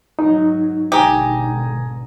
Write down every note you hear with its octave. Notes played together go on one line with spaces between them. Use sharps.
G#2 F#3 D#4
G#1 B2 D3 G4 G#5 A#5 D#6